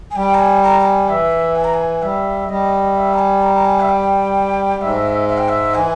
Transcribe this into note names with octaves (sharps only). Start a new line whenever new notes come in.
G#5
G3 G5
A#5
G#5
A#5
A#5
G#5
E3 E5
G#5
A#5
G#5
G3 E5
G3 D#5
E5
A#5
G#5
A#5
A#5
G#5
E5
G5
G#2 G#3 E5
E5
G5
E5
E3 G#5